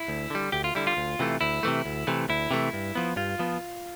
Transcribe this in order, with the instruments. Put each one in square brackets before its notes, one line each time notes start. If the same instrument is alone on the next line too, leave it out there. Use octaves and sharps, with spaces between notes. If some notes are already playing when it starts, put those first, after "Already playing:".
Already playing: [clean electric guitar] E4
D2
D3 G3
D2 G4
F4
D3 G3 E4
F4
D2
C3 E3 A3
D2 E4
C3 E3 A3
D2
C3 E3 A3
D2 E4
C3 E3 A3
G2
F3 B3
G2 F4
F3 B3